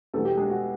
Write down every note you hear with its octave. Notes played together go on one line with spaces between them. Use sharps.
E2 B2 G3 A3 A4
G4
G#3 G#4
F#4